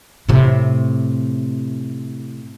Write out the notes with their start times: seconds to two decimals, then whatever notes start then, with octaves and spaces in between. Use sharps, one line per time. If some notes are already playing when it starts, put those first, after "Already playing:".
0.29 A2 C3